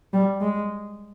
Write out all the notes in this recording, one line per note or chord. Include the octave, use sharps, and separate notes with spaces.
G3
G#3